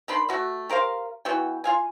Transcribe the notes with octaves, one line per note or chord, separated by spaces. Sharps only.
D#3 D4 B5 C6
A3 F#4 E5
G4 A#4 C5 F5
E3 B3 F#4 G5
F4 F5 G#5